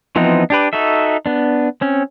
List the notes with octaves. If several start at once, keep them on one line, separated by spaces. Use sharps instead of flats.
E3 F3 B3 C4 D#4
D4 G4 B4
D#4 F#4 A4 E5
B3 D4
C4 C#4